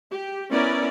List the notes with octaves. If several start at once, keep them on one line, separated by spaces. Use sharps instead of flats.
G4
B3 C#4 E4 A#4 D5